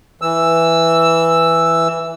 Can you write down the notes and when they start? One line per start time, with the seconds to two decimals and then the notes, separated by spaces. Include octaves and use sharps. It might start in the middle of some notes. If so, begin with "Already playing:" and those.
0.22 E3 E6